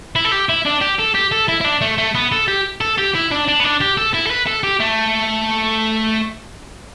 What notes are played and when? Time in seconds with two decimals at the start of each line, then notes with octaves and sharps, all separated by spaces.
0.16 E4
0.25 A4
0.32 G4
0.49 E4
0.65 D4
0.81 G4
0.99 A4
1.14 G4
1.32 A4
1.48 E4
1.61 E4
1.65 D4
1.81 A3
1.98 A3
2.15 B3
2.32 A4
2.48 G4
2.81 A4
2.98 G4
3.15 E4
3.31 D4
3.48 D4
3.60 B3
3.64 D4
3.81 G4
3.97 A4
4.14 E4
4.27 A4
4.31 B4
4.47 A4
4.64 G4
4.80 A3